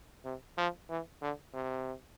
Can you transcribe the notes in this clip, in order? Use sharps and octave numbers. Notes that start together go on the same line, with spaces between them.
C3
F3
E3
D3
C3